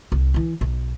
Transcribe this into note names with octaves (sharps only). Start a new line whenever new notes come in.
C2
E3 E4
B1